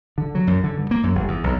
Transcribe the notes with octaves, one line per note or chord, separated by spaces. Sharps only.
D3
F#3
F#2
D3
G2
A#3
F#2
G1
E2
B1